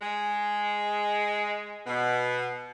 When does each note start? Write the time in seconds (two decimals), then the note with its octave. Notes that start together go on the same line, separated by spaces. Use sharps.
0.01 G#3
1.86 B2